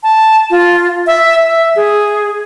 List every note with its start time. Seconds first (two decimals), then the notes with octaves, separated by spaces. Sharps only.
0.03 A5
0.51 F4
1.07 E5
1.47 E5
1.76 G#4